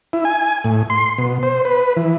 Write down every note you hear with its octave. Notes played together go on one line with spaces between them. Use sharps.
E4
G#5
A2
C6
B2
C5
B4
E3